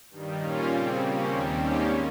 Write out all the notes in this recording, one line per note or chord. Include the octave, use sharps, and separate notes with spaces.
G2 D#3 G3
A#2 G3 A#3 C#4 F4
C#3 G3 C4
C#3 G3 A#3 C#4
D#2 D#3 G3 C4 G4
G#2 D#3 G3 A#3 C#4 G4